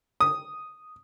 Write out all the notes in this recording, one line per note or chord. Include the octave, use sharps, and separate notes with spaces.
D#6